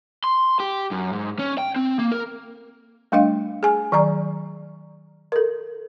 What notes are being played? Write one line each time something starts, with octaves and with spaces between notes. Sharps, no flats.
C6
G4
F#2
G#2
C#4
G5
C4
A#3
A#4
G3 A3 D4 D#5 F5
G#4 G#5
D#3 F#3 D5 A#5
A4 A#4